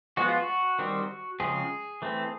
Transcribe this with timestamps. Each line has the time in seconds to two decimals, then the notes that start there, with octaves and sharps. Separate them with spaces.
0.17 F3 G#3 B3 F#4
0.28 F4
0.40 F#4
0.79 D#3 G3 C4
1.40 C#3 F3 G#3 C4 G#4
2.02 E3 A3 C4